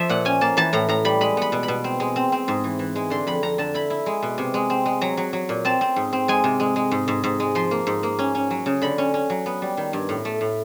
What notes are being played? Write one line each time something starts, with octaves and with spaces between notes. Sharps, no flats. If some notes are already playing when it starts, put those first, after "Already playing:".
Already playing: F3 E5
A#2 F#5
C#4 G#5
A#3 A5
E3 A5
A2 A#5
A2 A#5
G3 B5
G#3 B5
B3 B5
B2
B5
B2
C4
G#3
C4
C4
G#2
E3
E3
G#3
D3 C6
F2 B5
F2 A#5
D3 A5
E4 B5
E4
G#3
B2
C3
G#3
C4
G#3
F#3 A#5
F#3
F#3
A#2
C4 A5
C4
G#2
C4
G#3 G#5
C3
G#3
G#3
G#2
G#2
G#2
G#3
F3 C6
A#3
G#2
A#3
C#4
C#4
F#3
C#3
D3 B5
C#4
C#4
F#3
B3
G3
D#3
G2
A2
A3
A2